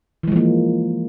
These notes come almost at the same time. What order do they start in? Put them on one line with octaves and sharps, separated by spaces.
E3 G#3 F3 A#3